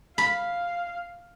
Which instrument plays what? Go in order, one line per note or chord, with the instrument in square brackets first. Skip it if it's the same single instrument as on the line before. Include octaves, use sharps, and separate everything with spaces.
[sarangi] F5 [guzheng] B5